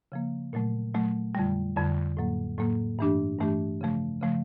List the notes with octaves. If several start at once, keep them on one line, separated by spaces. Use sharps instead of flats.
C#3 F3 A#3
A#2 F#3 A3
A#2 F#3 A3
F2 D3 G3
F2 D3 G3
A2 F#3 A#3
A2 F#3 A#3
G2 E3 A3 D4 G4
G2 E3 A3 D4 G4
C#3 F3 A3
C#3 F3 A3